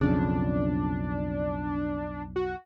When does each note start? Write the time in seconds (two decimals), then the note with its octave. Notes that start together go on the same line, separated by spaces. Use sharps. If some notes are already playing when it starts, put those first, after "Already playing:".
0.01 B1 F2 C#3 D4
2.36 F#4